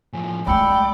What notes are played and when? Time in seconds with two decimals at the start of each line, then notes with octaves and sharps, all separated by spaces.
0.13 A2 F3 G#5
0.47 G#3 A3 D5 G5 B5 E6 C#7